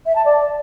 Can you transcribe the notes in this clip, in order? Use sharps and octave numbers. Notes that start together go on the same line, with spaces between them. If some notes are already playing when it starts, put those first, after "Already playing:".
E5
A5
D5